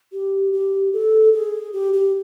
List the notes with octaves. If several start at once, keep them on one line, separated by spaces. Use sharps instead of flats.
G4
G4
A4
G#4
G4
G4